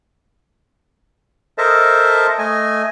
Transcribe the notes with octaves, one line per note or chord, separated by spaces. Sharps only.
A4 A#4 C5 D#5 E5 A5
A3 D#5 G#5